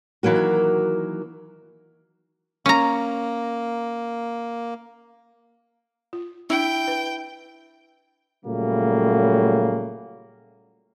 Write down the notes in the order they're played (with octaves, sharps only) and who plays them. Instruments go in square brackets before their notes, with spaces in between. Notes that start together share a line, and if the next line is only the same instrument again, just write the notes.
[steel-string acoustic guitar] D#3 E3 F#3 A#3 F#4
[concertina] A#3 [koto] C#4 A#5
[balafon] F4
[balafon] D4 [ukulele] E4 [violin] G5
[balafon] B4
[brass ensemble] A#2 C#3 F#3 G3 A3 A#3